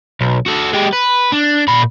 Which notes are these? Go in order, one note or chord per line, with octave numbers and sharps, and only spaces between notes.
B1
F#4 A4
G#3 G4
B4
D4
A#2 B5